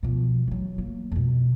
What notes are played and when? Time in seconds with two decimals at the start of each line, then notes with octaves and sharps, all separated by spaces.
0.03 B2 F3
0.48 E3 F#3
0.78 A#3
1.12 F2 B2